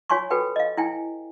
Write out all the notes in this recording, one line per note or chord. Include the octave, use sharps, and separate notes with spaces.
F4 C#5 G#5 C6 C#6
F#4 A4 B4 G5
D#5 F5
E4 G5 G#5